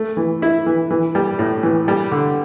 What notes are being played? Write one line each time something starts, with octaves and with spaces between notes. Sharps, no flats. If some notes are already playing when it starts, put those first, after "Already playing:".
Already playing: A3
E3
E4
E3
E3
G3
A2
E3
G3
D3